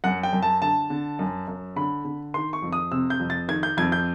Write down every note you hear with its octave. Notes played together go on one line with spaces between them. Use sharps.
F#2 F#5
G5
F#2
A5
D3 A5
D3
F#2
F#2
D3 B5
D3
D#3 C6
C#6
F2
D#6
C3 E6
G6
F2
A6
D#3 G#6
G6
F2 G#6
G6